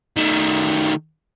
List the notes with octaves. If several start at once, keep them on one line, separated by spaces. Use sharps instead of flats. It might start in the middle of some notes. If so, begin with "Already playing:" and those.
D#3 A3